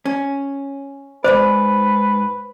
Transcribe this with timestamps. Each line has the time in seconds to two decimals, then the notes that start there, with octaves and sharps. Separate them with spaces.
0.06 C#4
1.24 G#2 C3 B4 C5 D5